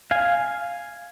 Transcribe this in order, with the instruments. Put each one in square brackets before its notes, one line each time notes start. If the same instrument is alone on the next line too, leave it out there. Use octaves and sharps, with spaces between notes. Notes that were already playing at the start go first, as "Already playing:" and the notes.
[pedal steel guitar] F5 G#5